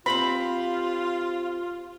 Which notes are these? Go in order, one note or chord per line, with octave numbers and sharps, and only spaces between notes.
C4 F4 G4 C5 B5